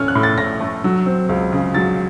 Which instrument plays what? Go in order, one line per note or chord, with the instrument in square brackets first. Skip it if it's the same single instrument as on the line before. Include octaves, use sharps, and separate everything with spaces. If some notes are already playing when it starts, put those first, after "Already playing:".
Already playing: [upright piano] A2 A3 C#4 F6
F#6
A2
A6
A2 A#6
A3
F#3
C4
C#2
C#3
F#3 A6